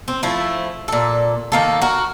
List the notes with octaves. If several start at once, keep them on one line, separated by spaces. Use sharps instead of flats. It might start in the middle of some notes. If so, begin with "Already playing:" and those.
C4
F3 A3 E4
A#2 A4
D#3 A#3 A4
F#4 A#4